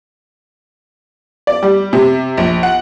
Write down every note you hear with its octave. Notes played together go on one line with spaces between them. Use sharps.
D5
G3
C3
A#1
F#5